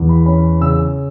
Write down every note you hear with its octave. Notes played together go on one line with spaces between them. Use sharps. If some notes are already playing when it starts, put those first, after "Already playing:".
Already playing: E2 E3
B5
C#4 B5
C#3 E6